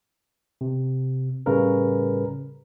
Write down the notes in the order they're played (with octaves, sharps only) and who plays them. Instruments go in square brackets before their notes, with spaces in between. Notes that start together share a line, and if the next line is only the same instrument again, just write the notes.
[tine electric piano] C3
A2 C#3 G3 A#4 B4